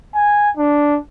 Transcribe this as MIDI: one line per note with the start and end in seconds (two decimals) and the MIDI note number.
0.15 0.50 80
0.57 0.98 62